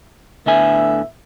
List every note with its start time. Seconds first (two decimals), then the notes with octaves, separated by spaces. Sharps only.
0.46 D2 A2 D3 B3 E5 G#5